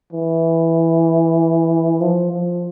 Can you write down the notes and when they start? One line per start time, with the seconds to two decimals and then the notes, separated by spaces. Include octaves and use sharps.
0.13 E3
2.01 F3
2.32 F3